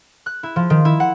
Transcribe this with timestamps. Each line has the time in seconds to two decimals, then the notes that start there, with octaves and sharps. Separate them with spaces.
0.26 F#6
0.43 E4
0.56 F3
0.70 D#3
0.85 E4
1.00 F#5